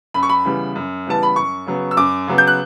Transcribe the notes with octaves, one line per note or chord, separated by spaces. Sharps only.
F#2 B5
C#6
B5
C#3 E3 G3 B3
F#2
C#3 E3 G3 B3 A5
B5
F#2 C#6
C#3 F#3 B3
E6
F#2 D6
C#3 F#3 B3
G6
F#6